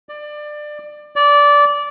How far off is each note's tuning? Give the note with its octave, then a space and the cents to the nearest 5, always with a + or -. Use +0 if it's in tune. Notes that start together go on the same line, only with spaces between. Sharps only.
D5 +25
D5 -15